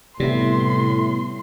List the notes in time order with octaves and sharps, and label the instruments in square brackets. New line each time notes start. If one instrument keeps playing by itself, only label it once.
[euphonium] A2 [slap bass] C3 [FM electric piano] G3 B3 E4 [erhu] C6